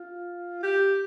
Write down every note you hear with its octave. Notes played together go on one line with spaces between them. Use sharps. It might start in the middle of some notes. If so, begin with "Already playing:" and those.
Already playing: F4
G4